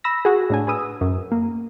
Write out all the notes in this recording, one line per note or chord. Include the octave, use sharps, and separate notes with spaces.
B5 E6 A#6
F#4 G#4
A2 D4 G#5
G#4 B4 D#6 E6
F#2
A#3